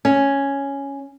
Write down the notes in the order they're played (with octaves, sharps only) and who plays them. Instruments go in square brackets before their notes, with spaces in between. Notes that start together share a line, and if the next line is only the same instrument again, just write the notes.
[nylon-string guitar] C#4